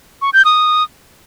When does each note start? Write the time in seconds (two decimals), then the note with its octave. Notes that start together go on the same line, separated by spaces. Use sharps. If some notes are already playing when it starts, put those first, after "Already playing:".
0.22 C#6
0.33 G6
0.45 D#6